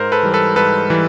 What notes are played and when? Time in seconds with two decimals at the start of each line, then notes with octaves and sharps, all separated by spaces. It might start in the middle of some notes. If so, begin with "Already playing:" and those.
Already playing: G#2 A#4 C5
0.12 A4 B4
0.23 E3 G3
0.34 A4 B4
0.56 G#2 A4 B4
0.90 E3 G3